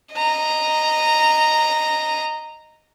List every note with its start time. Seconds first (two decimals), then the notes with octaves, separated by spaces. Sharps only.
0.14 D#5 A#5